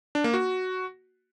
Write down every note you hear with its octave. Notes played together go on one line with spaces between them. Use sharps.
D4
A#3
F#4